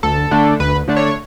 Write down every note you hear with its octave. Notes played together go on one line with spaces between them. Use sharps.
D2 A4
D3 A3 D4
D2 B4
D3 A3 D4
C#5